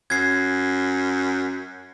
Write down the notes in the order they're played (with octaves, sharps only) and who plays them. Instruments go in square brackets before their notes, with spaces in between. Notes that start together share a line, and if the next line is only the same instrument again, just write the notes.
[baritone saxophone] F#2 [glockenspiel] G#6 C7